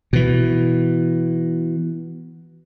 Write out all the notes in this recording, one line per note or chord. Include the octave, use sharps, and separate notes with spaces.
B2 E3